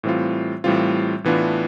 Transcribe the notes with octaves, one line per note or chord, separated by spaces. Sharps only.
A2 E3 G3 C4 F4
A2 E3 G3 C4 F4
A2 E3 B3 D4 F4